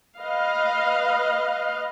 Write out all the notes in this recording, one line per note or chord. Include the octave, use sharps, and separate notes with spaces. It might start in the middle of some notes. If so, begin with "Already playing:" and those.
B4 D#5 F5